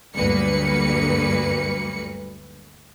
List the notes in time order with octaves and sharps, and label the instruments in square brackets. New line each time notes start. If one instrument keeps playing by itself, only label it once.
[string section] D2 G2 F#3 A#3 B4 C#7